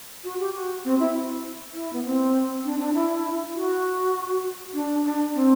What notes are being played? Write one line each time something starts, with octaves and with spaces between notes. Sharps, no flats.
F#4
G4
F#4
C4
E4
E4
B3
C4
D4
D4
E4
F#4
D4
D4
C4